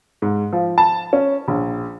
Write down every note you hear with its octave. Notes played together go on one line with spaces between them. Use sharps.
G#2
F3
A5
C#4
A#1